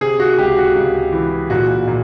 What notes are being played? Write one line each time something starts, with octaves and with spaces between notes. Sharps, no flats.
C3 G#4
F#4
C#2 G4
F#4
C#2
E3
A#2 F#4
A#2